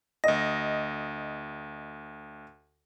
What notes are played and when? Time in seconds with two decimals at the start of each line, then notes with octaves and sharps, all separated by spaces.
0.24 D2 D#5 A#6